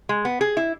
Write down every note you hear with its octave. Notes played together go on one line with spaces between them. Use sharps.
G#3
B3
G#4
E4